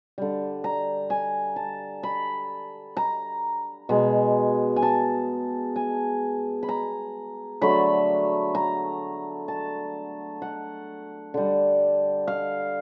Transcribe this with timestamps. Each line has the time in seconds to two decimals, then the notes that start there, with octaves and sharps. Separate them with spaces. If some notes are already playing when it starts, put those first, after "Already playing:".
0.18 D3 G3
0.64 A#5
1.10 G#5
1.56 A5
2.03 B5
2.97 A#5
3.89 B2 G#3
4.76 G#5
4.82 A5
5.76 G#5
6.63 B5
6.69 A#5
7.62 D3 F#3 A3 B5
8.55 A#5
9.48 A5
10.42 F#5
11.34 D3 G3
12.27 F5